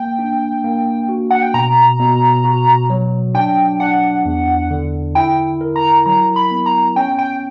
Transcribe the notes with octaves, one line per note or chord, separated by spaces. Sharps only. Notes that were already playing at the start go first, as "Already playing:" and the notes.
Already playing: A#3 G5
D4
A#3
F#4
F#5
G5
B2 A#5
B2
F#4
F#3
D4 G5
D4 F#5
E2
D3
E4 G5
A#4
A#5
F#3 A#5
B5
B3
A#5
C#4 G5
G5